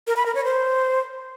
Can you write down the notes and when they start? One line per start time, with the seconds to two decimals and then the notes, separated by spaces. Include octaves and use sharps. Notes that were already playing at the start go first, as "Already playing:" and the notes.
0.07 A#4
0.16 B5
0.26 A#4
0.35 C#5
0.44 C5